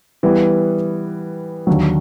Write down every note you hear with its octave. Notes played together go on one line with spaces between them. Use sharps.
E3 G3 B3
D#2 D3 F#3